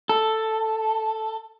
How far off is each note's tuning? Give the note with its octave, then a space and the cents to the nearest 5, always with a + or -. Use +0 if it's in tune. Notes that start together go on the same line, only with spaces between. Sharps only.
A4 +5